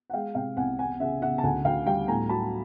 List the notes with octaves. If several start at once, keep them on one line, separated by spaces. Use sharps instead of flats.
F#5
G#3 F5 G5
C3 F5 G5
C2 F#5 G#5
E2 F#5 G#5
C#3 E5 F#5
C#3 E5 F#5
A5
D2 F#5 G#5
D2 F5 G5
G3 F5 G5
A2 G#5 A#5
F#3 A5 B5